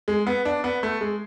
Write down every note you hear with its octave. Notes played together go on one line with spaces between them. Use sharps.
G#3
B3
D4
B3
A3
G#3